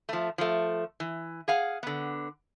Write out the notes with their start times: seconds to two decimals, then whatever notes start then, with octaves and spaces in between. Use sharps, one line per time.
0.09 F3 A3
0.38 F3 A3
1.00 E3
1.48 G#4 F5 F#5
1.83 D3 B3